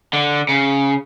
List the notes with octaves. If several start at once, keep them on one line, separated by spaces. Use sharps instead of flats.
D3
C#3